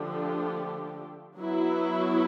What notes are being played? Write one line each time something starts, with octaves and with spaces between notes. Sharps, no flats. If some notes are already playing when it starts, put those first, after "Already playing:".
Already playing: D3 F3 A3 D4 G4
F#3 B3 E4